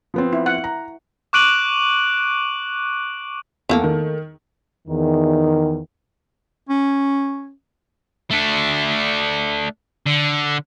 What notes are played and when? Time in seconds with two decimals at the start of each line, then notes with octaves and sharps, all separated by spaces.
0.14 F3 B3 C4
0.33 E4
0.46 F#5
0.64 A#5
1.33 C#6 D6 F#6 D7 D#7 F#7
3.69 E2 A3 A#3 A4
3.84 D#3
4.88 E2 D#3
6.69 C#4
8.31 A3 D4
10.06 D3